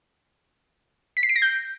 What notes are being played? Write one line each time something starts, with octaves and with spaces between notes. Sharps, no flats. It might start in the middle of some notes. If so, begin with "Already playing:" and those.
B6
C7
D7
A#6
G6